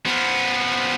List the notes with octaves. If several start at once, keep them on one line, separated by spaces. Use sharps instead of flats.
F3 B3